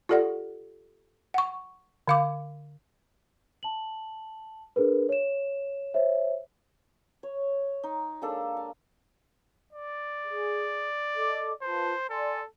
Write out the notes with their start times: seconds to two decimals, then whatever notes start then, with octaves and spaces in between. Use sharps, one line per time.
0.09 F4 G4 A4 D5 F#5
1.34 F#5 C#6
2.08 D3 F5 D6
3.63 A5 F#7
4.76 D4 G#4 A#4 B4
5.09 C#5 E7
5.94 C5 C#5 E5
7.23 C#5
7.83 D#4
8.22 G#3 A#3 D4 A4
8.57 F5
9.73 D5
10.25 G#4
11.15 A4 D#5 D6
11.62 F4 B4 C5 A5
12.10 A4 D5 G#5 C6